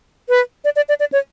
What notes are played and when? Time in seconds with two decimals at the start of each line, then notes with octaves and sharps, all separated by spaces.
0.29 B4
0.65 D5
0.76 D5
0.89 D5
1.00 D5
1.12 C#5